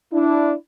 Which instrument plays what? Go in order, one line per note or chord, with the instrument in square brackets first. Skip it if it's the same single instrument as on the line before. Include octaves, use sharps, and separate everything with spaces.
[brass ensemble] D4 E4